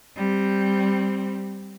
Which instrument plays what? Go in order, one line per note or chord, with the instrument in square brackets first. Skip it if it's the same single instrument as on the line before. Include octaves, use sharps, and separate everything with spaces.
[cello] G3 C4